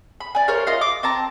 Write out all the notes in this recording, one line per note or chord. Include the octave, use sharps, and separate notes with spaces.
B5
D5 G#5
A#4 C5 C#5 F5
F4 D#5 F5
D6
C4 A5 A#5